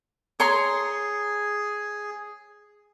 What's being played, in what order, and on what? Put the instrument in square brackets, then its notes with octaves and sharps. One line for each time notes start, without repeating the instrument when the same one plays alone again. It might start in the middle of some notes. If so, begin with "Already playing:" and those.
[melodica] G#4 [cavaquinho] C#5 A#5 C6